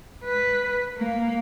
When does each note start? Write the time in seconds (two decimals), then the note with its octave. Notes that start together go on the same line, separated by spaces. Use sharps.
0.25 B4
0.97 A#3